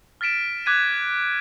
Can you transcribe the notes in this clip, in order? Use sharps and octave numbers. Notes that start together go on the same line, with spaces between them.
F6 A6 B6 D7 E7
D6 F#6 G#6 B6 D#7